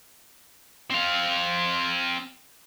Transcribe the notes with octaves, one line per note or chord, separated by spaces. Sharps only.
C4 F5